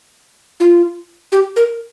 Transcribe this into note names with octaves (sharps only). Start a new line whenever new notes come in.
F4
G4
A#4